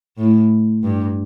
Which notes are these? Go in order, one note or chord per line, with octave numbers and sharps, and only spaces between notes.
A2
G2